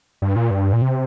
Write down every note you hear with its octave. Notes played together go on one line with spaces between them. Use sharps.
G2
A#2
G2
A#2
C3